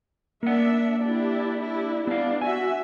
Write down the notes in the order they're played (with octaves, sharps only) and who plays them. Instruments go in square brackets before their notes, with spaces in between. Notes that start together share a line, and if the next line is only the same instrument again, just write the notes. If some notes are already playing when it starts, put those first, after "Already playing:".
[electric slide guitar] A#3 F#5 [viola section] D4 E5
[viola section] D4 E4 G4
D4 E4 G4
[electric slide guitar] B3 F5 [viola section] D4
[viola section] F#4 E5 [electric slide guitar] G#5